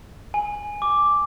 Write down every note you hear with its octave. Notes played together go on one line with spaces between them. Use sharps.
G#5
D6